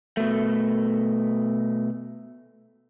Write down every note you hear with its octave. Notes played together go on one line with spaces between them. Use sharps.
B2 A3